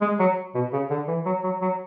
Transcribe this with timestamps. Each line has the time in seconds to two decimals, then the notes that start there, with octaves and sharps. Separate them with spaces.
0.01 G#3
0.19 F#3
0.54 B2
0.73 C#3
0.90 D3
1.08 E3
1.25 F#3
1.43 F#3
1.61 F#3